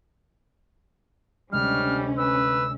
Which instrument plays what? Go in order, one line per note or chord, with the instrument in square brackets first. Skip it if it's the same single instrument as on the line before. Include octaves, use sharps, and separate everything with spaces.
[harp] D2 C3 G#3 [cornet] G3 [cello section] C#4 [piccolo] F6
[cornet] B4 [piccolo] E6